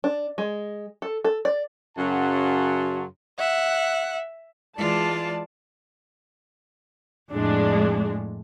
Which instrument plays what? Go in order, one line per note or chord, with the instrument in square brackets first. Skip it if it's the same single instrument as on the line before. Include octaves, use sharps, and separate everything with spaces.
[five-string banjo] D4
G#3
A4
A4
D5
[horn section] F#2 C#3 F#3 F#4 A5 C6
[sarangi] E5 [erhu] F#5
[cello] E3 F4 [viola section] G#3 D5 A5
[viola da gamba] F2 A2 [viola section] G#3 D4